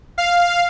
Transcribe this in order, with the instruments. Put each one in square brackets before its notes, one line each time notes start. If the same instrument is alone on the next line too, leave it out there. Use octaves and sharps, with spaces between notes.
[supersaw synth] F5